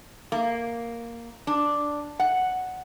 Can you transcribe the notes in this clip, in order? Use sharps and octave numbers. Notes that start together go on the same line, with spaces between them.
A#3
D4
F#5